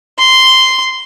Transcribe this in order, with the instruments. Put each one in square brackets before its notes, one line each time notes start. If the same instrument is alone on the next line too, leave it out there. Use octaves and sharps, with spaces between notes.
[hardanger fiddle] C6